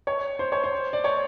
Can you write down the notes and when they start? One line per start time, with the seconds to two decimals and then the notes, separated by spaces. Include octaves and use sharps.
0.07 C#5
0.39 C5
0.52 C#5
0.64 C5
0.93 D5
1.04 C#5